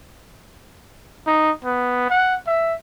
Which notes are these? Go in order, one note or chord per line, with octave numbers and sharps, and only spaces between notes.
D#4
B3
F#5
E5